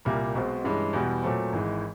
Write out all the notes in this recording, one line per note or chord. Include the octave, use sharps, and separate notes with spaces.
C2 A#2 G3 A#3
B1 B2 G#3 C4
G2 E3 G#3 C#4
E2 B2 G3
A#2 F#3 A3 C4
G#1 G#2 E3 G#3